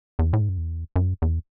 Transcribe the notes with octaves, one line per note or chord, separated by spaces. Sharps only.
E2
A2
G#2
F#2
E2
F#2
E2